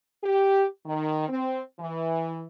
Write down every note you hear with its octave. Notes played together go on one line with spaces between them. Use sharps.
G4
D#3
C4
E3